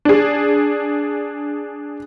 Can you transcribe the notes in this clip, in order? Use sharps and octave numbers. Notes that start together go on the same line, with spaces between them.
D4 G#4